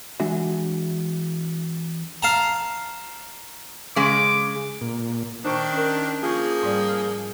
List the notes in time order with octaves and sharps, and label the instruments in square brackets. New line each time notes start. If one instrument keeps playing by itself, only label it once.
[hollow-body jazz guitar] E3 G#3 D4 F#4 E5
[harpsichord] F5 A5 A#5
[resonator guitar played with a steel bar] C#3 G#3 [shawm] D6
[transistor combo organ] A#2
[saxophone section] D#3 D4 [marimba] C5 C#6
[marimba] C#4 A#4
[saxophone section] F3 A#3 G#4 [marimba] F4 C#6
[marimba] G#2 G3 D5